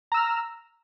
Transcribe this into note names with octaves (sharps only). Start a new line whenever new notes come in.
A#5 E6 F6